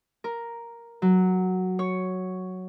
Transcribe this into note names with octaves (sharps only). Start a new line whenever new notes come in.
A#4
F#3
C#5